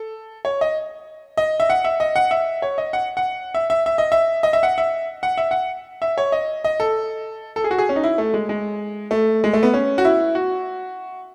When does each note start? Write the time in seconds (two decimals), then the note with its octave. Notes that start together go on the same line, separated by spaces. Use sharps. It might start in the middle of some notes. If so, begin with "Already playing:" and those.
Already playing: A4
0.45 C#5
0.61 D#5
1.37 D#5
1.60 E5
1.70 F#5
1.85 E5
2.00 D#5
2.16 F#5
2.31 E5
2.62 C#5
2.78 D#5
2.93 F#5
3.17 F#5
3.55 E5
3.70 E5
3.86 E5
3.98 D#5
4.12 E5
4.43 D#5
4.53 E5
4.63 F#5
4.78 E5
5.23 F#5
5.38 E5
5.51 F#5
6.02 E5
6.18 C#5
6.32 D#5
6.64 D#5
6.80 A4
7.56 A4
7.64 G#4
7.71 F#4
7.78 G#4
7.89 C#4
7.96 D#4
8.04 E4
8.18 A3
8.34 G#3
8.49 G#3
9.11 A3
9.44 G#3
9.53 A3
9.63 B3
9.74 C#4
9.98 F#4
10.05 E4
10.35 F#4